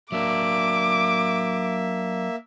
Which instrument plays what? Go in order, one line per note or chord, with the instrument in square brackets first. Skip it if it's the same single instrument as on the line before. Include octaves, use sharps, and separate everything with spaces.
[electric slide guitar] F#3 D4 [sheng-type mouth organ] A#3 E5 [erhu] D6